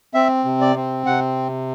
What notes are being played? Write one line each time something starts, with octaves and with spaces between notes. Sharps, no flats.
C4 E5
C3
D5
C4
C3 F#5